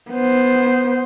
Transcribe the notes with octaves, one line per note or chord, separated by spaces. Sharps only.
B3 C5